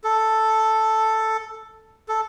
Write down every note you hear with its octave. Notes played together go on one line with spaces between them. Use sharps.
A4
A4